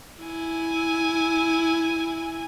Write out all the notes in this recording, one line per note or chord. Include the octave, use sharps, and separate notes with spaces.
E4 G#5